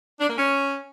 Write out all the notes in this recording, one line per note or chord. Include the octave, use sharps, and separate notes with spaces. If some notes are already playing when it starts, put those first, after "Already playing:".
D4
A#3
C#4